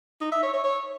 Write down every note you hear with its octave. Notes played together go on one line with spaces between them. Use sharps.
D#4
E5
C#5
C#5
C#5